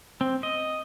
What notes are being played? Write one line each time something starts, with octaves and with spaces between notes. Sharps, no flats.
C4
D#5